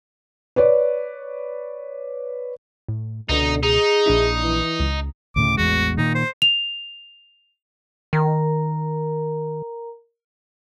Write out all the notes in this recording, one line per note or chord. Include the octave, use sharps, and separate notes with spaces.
B4 C#5 D5
A2
C#2 B2 D3 D#4
D#4 G#4
A#1 D4 E4
E3
C#2
D2 A2 C#3 D6
A1 E2 G#3 F#4
A#2 D#3 D#4
C5
F7
D#3 A#4 A#5